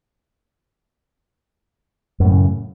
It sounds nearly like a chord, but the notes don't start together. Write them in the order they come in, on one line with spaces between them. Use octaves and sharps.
F#2 A2 C#3